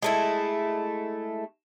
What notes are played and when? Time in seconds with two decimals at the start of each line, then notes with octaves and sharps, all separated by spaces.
0.03 G#3 A3 E4